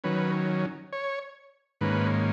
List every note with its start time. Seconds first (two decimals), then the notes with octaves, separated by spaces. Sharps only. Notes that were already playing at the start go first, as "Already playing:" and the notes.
0.04 D#3 F#3 C#4 B4
0.93 C#5
1.81 G#2 D#3 A#3 C#4 B4